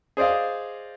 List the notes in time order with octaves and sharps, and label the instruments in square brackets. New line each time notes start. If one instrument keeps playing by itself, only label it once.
[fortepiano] G#4 C5 D5 D#5 F5